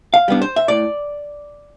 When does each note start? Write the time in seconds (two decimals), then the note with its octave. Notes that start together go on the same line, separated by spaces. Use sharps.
0.14 F5
0.28 G3 B3 D4
0.42 C5
0.56 E5
0.68 A2 D5